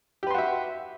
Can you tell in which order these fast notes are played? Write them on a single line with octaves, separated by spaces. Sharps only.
G4 B4 C6 F#4 E5